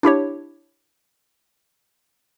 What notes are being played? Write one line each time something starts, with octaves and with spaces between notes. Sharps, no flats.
D4 E4 G4 C#5